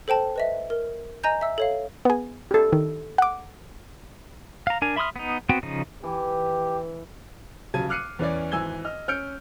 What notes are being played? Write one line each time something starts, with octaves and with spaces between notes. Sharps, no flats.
A4 C5 G5 A5
B4 D#5 E5
A#4
D#5 G#5 A#5 G6
E5 E6
A4 C#5 F5
B3 G#4
G4 A4
D#3
F#5 D6
F5 A#5
D4 A#4 G#5
E5 B5 C6 D#6 F6
B3 D#4
B3 C4 F#4 G5
C#3 F3 D#4
E3 G4
D#1 C#3 F#3 A5 G#6 D#7
D6 F6 F#6 C7 C#7 D#7
E2 E3 C#4 C#5 D5
G#1 E3 G#5 E6 G#6 G7
D#5 F6
C#4 F6 G6 C#7 D7